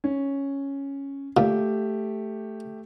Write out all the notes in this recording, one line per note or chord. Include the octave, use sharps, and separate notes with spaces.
C#4
A#2 A3 G4